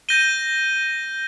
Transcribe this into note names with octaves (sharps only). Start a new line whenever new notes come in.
G6 A#6 D#7 G7